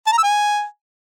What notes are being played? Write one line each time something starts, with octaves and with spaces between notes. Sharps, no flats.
A5
A#5
E6
G#5